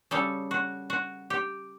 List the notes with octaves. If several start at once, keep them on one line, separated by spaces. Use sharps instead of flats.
C#3 G3 A4
F#4
F#4
G4